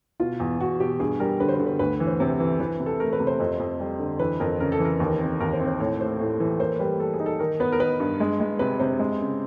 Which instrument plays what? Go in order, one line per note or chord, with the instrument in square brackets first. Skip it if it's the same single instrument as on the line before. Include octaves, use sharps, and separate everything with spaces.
[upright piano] B2 [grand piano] F4
[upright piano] E2
[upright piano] E2 [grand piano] F#4
[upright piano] B2 [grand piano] G4
[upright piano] G2 [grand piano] G#4
[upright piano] G3 [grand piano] A#4
[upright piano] D3 [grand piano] B4
[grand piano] C5
B4
[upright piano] D3
[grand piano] B4
[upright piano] D2 [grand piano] B4
[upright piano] E3
[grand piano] C5
[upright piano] C3 [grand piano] C5
[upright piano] E3
[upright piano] E3 [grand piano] B4
[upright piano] C3
[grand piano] A4
[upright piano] A3 [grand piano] A#4
[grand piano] B4
[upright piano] C3
[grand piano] C5
[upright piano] F2
F2
G3
D3
[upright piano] E3 [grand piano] B4
[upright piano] F2 [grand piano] A#4
[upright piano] C#3 [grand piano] A#4
[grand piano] A4
[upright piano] E3 [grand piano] A#4
[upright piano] D#2
C4
[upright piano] D#2 [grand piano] A#4
[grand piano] C5
[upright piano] C4
[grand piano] C5
[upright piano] A2 [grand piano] C#5
[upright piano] A3 [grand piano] C5
[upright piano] A2
E3
[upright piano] A#3 [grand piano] C5
[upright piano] G3 [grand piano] B4
[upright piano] A#3 [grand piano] A4
[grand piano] G#4
[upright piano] D#4
[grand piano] A4
[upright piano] D#3 [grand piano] A#4
[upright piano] B3 [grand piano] B4
[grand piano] A#4
[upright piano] D#3 [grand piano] B4
[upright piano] G2
G#3
G#3
[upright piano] C3 [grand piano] B4
[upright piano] C3 [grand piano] C5
[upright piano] G#3
C#3